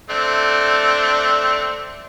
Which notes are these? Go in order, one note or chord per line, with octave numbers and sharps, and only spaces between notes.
A3 C4 D4